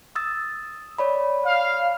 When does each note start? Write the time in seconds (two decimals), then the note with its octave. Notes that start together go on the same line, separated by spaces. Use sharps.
0.15 D#6 E6 A6
0.98 C#5 D5 B5
1.46 F5